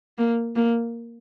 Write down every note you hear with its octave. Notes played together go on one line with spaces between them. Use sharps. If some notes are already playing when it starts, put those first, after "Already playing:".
A#3
A#3